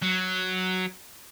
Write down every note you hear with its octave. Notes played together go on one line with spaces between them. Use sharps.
F#3